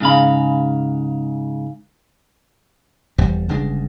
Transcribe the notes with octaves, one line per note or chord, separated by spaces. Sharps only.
G#2 C#3 F5 B5
F1 E2 G3
G1 C#3 G#3 D4